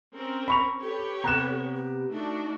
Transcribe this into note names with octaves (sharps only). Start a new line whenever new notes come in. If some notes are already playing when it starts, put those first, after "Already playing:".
C4 C#4 A#4
B5 C#6 F7
G4 A4 B4 C#5
C3 B3 A#5 E7
G4
A3 D4 D#4 F#4